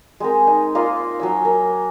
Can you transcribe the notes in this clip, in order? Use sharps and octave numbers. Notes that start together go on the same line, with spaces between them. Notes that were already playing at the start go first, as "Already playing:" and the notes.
G#3 C4 A#4
D#4
A#3 F4 D#5 C6
F#3 C#4 E6
A#4